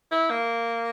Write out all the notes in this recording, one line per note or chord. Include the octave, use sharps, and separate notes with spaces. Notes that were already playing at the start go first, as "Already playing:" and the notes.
E4
A#3